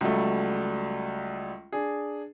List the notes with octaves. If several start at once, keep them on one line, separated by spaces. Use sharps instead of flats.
C#2 F#3 G3 A3
D4 G#4